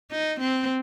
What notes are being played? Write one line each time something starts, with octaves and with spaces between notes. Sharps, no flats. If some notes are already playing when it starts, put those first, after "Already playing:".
D#4
C4